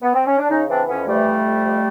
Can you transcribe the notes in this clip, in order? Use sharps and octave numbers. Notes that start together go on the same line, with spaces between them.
B3
C4
C#4
D4
C#3 C#4 D#4
E3 C4 D4
F2 B3 C#4
E3 G3 A3
F2
F2
F2